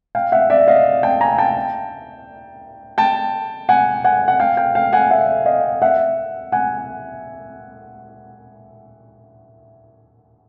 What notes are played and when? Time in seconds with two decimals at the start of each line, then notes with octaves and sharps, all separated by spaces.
0.15 F5 G5
0.32 E5 F#5
0.50 D5 E5
0.68 D#5 F5
1.03 G5 A5
1.21 G#5 A#5
1.38 G5 A5
2.98 G5 A5
3.69 F#5 G#5
4.04 F#5 G#5
4.28 F#5
4.40 F5 G5
4.57 F5 G5
4.75 F5 G5
4.93 F#5 G#5
5.11 E5 F#5
5.46 D#5 F5
5.82 E5 F#5
6.52 F#5 G#5